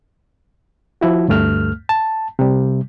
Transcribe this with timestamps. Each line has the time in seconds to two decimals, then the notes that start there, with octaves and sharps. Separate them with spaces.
1.01 F3 E4 F#4
1.28 D2 G2 A3 F6
1.89 A5
2.39 C3 G3